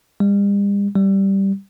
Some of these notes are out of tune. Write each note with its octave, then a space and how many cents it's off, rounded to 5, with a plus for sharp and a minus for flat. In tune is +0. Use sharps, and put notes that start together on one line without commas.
G3 +45
G3 -5